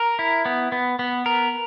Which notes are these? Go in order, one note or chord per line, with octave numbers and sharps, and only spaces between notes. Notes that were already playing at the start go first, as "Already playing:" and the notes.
Already playing: A#4
E4
B3
B3
B3
A#4